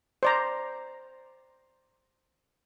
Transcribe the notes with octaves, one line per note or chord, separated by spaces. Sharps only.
C5 D5 A#5